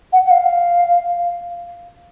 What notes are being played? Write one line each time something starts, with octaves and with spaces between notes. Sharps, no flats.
F#5
F#5
F5